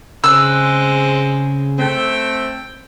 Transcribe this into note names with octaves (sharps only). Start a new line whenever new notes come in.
C#3 G#3 C4 E6 F#6
A3 C4 G5